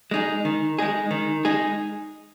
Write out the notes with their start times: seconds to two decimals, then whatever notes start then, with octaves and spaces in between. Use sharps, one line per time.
0.11 G#3 D#4 G#4
0.45 D#3
0.79 G#3 D#4 G#4
1.11 D#3
1.45 G#3 D#4 G#4